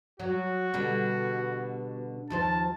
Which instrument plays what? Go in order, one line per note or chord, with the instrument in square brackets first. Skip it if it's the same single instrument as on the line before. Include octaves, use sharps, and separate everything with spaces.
[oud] F#3 [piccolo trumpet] F#4
[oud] B2 D3 G3
[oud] D#2 F3 C5 [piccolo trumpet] A5